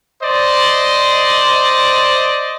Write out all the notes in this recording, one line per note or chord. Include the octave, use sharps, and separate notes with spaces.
C5 D5 D#5